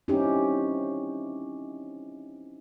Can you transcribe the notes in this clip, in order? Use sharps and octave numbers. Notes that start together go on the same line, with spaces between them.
C4 C#4 D#4 E4 G4